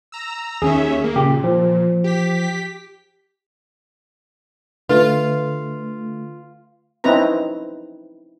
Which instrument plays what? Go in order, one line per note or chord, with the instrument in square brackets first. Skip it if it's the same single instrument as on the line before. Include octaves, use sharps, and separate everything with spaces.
[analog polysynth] A#5 E6
[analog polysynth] D#2 C#4 E5 [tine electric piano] G#4
[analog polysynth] A#3
[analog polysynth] A#2 [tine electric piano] C#3 G4
[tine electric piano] F3
[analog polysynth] G4 B6
[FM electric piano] D3 A3 [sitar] F4 [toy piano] B4
[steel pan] C4 C#4 D#4 E4 B4 A#5